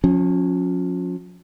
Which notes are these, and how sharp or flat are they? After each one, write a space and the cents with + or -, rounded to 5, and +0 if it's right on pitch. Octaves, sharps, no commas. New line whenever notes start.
F3 +45 C#4 +0